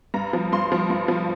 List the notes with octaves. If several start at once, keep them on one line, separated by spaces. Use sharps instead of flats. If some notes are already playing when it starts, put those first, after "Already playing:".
G2 A#5
F3
G2 C6
F3
G2
F3